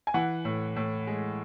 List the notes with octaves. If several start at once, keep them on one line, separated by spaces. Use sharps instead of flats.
G#5
E3 F#5
A2
A2
G#3